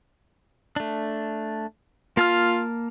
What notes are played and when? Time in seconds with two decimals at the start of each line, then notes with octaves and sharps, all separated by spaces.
0.76 A3 D4
2.17 A#3 F4 A5 F6